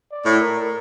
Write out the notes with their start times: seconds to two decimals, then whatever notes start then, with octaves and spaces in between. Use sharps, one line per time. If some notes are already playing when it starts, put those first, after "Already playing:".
0.12 D5
0.26 A2
0.40 A#4